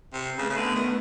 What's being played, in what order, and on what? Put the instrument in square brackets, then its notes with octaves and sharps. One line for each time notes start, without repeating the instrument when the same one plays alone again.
[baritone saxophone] C3
[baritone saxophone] C#3 [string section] A3 B3
[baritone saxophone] C#3
D3
D#3